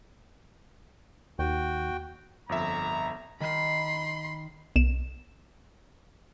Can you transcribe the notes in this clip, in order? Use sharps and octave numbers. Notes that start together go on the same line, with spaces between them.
D#2 F#4 G5
G1 F2 E5 A#5
D#3 B5 C6
B1 E7